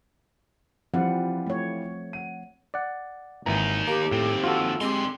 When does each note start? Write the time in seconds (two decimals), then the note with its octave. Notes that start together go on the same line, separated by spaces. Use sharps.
0.94 E3 F3 G3 C4 F4 F#5
1.47 A3 C#5
2.13 F#5 D#7
2.74 D5 F#5
3.46 G#1 D#2 E3 D#4 A#5
3.87 A#3 G4
4.11 D#2 A2 C4
4.44 F4 F#4 A4
4.81 D3 G#3 C4 G4 C6